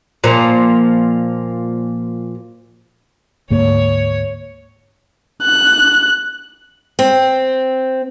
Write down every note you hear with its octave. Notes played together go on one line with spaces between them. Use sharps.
A#2 F3
D2 G#2 A#3 C#5
F#6
C4